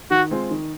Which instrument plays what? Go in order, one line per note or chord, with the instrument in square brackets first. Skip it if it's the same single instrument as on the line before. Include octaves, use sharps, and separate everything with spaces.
[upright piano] D#3 [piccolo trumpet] F#4
[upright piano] G#3 C4 F4
D#3